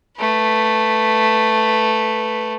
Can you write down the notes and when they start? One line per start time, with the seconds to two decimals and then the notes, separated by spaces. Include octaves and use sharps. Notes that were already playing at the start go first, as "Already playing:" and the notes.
0.18 A3 B4